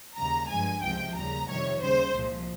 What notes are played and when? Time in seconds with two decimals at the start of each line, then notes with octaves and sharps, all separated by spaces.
0.17 D#2 C#3 G3 A#5
0.49 G2 F3 G#3 G#5
0.82 C#2 C3 F3 G#3 G5
1.15 D#2 C#3 G3 A#5
1.49 F2 C3 D#3 G3 C#5
1.81 D#2 C#3 G3 C5
2.15 C2 A#2 F3 G#3